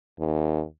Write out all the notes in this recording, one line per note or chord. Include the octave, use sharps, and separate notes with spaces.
D#2